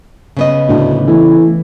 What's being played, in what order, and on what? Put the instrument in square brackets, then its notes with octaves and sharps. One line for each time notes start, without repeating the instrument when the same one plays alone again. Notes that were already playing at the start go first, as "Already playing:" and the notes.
[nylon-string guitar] C#3 B3 D#5
[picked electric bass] D1 A2 D3 [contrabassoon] D2
[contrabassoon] A2 [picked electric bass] E3